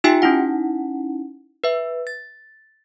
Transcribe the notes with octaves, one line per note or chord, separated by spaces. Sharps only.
D#4 F4 G4 E5 G5 G#5
C#4 D#4 E4 F#5
B4 E5
A6